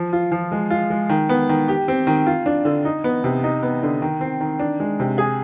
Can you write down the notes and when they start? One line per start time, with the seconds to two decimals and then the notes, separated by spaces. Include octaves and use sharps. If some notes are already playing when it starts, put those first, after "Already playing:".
Already playing: F3
0.13 F4
0.32 F3
0.52 G#3
0.70 F4
0.90 G#3
1.09 D#3
1.29 B3
1.49 D#3
1.68 G4
1.88 C4
2.07 D#3
2.27 F4
2.46 D4
2.65 D3
2.85 D#4
3.04 B3
3.24 C3
3.44 D#4
3.63 B3
3.83 D3
4.02 D#3
4.21 C4
4.40 D#3
4.59 D4
4.80 G#3
5.00 C3
5.18 G#4